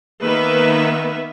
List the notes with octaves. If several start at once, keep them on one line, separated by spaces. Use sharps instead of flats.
D#3 A#3 B3 B4 E5